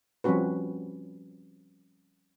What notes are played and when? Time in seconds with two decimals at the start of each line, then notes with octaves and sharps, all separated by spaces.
0.24 F3 G3 C4 C#4 F#4 B4